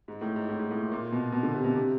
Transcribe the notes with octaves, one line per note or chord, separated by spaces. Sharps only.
G#2
A2
G#2
A2
G#2
A2
A#2
A#2
B2
B2
D3
C3
B2
C3